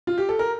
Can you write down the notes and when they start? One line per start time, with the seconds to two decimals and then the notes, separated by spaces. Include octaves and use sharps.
0.07 F4
0.18 G4
0.29 A4
0.39 A#4